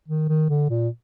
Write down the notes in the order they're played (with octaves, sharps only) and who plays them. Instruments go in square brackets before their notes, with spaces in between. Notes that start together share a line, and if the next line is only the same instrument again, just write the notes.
[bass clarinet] D#3
D#3
D3
A#2